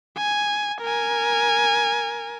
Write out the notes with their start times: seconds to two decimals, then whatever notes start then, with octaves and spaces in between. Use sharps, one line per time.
0.17 G#5
0.81 A#4 G#5